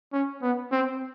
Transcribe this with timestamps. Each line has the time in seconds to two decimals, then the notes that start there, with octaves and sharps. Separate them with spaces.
0.13 C#4
0.42 B3
0.72 C4